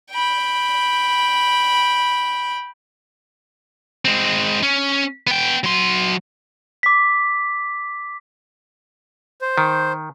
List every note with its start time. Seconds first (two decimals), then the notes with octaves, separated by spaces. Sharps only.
0.11 G5 B5
4.05 G#3 C4
4.63 C#4
5.27 B3 G5
5.64 F#3 C6
6.83 D6 B6
9.42 C5
9.58 D#3